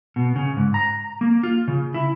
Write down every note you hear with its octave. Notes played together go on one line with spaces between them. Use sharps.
B2
C#3
G#2
A#5
A#3
F4
C#3
E4